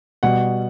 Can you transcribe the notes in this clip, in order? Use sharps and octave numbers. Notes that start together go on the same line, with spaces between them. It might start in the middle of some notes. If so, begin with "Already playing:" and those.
B2 G3 F#5